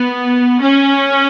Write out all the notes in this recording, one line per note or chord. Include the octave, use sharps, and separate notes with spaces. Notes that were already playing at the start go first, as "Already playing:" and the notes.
Already playing: B3
C#4